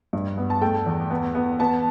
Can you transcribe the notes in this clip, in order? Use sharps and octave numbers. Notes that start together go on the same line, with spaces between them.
G2
B3
A5
A3 G5
E2
B3
B3
B3 A5